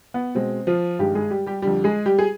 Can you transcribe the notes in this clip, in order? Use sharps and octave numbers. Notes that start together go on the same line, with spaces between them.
B3
B2 G#3 C4
F3 F4
G2 D#3 G3 G#3 G4
G#3 G#4
G3 G4
G3 G4
F2 D3 G3 G4
G#3 G#4
G3 G4
G#4